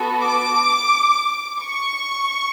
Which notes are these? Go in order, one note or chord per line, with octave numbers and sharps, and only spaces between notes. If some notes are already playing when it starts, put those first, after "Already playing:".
Already playing: B3 F#4 A4
D6
C#6